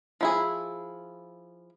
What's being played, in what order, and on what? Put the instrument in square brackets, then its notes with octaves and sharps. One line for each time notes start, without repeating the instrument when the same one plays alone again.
[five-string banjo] F3 E4 G#4